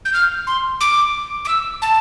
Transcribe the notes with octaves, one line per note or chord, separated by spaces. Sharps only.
G6
F6
C6
D6
D6
E6
A5